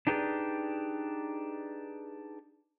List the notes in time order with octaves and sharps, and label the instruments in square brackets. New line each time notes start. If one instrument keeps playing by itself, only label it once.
[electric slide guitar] D4 D#4 G4 G#4 B4 D5